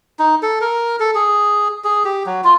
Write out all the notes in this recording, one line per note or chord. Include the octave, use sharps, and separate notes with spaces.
D#4
A4
A#4
A4
G#4
G#4
G4
F#3
F4